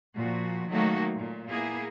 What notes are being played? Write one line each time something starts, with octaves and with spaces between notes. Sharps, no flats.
A#2 F3 F#4
D#3 F#3 A3 A#3 D#4 F#4
A#2
A#3 B3 E4 G#4